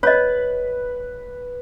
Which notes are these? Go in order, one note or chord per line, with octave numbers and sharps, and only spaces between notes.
B4 C#5 D#5